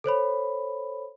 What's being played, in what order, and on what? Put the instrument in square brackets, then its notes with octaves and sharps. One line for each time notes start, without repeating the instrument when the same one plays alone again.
[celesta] A4 C5 C#5 B5